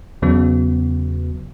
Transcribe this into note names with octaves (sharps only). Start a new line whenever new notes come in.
E2 C#3 F#3 B3